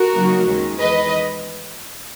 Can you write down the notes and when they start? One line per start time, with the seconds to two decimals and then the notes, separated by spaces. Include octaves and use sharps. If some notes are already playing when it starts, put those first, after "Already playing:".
Already playing: F#4 A#4
0.14 C#3 F#3 A#3 D#4
0.45 D#2 D#3 G#3 C#4
0.77 E2 D#3 G#3 B4 D#5